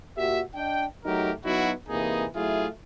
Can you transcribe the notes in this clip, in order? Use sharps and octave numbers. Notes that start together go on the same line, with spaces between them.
A#2 F#4 G4 E5
D4 D#5 G5
F#3 A3 D#4 G4 A#4
F#3 B3 D#4 E4 F#4
C3 E3 A#3 D#4 G#4
F#3 A3 E4 F4 G#4